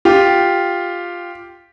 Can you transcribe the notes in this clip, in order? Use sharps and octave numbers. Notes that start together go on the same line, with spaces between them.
F4 G4